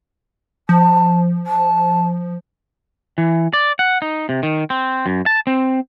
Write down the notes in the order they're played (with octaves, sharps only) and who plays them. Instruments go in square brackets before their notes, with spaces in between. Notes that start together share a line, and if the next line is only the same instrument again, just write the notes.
[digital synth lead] F3 [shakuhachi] A5
[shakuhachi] A5
[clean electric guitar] E3
D5
F#5
D#4
C3
D#3
C4
F#2
A5
C4